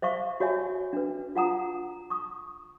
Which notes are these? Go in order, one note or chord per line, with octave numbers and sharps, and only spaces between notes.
C5 E5 F5 C#6
F#4 C#5 E5 G#5
D4 B4
F4 F#5 A#5 D#6
C#6 D#6